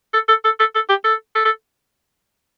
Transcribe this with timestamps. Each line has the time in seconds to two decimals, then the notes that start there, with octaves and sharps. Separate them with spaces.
0.14 A4
0.28 A4
0.45 A4
0.59 A4
0.75 A4
0.89 G4
1.04 A4
1.35 A4
1.45 A4